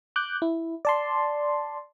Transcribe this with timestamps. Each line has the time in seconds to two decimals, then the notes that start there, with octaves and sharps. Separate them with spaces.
0.16 D6 F#6 G6
0.42 E4
0.85 D5 A5 C6